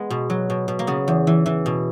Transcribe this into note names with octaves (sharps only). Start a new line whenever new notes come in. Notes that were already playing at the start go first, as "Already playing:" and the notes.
Already playing: G#3 B3
B2
F#3
B2
B2
A#3
C#3 B3
E2
E3
E3
B2